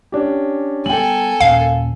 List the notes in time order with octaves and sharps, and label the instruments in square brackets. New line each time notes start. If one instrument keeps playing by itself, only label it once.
[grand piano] C#4 D4 G4
[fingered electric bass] G3 B3 [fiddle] A4 G#5 [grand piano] G5 F#7
[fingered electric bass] D#2 A#2 C#4 [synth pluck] F5